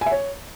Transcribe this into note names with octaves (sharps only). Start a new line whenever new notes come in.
G#5
E5
C#5